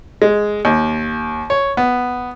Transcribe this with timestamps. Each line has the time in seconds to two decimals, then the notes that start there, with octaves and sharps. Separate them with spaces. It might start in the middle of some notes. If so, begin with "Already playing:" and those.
0.22 G#3
0.65 D#2
1.50 C#5
1.77 B3